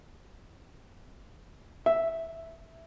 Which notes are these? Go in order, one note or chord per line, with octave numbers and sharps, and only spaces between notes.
E5